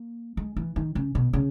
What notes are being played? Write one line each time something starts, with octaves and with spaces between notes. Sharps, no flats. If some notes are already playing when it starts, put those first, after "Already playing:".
Already playing: A#3
G#3
E3
D#3
C#3
B2
C#3